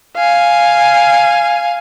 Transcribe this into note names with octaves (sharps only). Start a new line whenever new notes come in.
F5 G#5